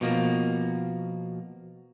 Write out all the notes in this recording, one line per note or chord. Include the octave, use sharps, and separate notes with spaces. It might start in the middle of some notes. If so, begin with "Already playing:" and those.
B2 F3 A#3